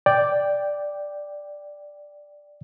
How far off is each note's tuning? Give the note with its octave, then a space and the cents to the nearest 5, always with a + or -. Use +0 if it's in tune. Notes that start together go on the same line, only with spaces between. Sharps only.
D5 +0 G5 +0